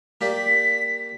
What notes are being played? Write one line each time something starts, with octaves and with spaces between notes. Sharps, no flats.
A#3 G4 D5 B6